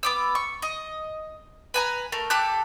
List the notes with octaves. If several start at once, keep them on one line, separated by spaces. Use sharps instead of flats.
B3 D6 E6
C#6
D#5
B4 G#5 A#5
A3 A#4
G4 A4 D6 F#6